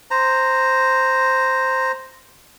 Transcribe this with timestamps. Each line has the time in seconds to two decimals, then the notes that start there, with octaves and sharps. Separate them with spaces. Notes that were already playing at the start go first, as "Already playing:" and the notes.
0.11 C5 A#5